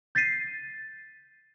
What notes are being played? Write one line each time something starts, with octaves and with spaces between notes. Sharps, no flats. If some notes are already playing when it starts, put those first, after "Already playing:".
G6 A6 B6 C7 D#7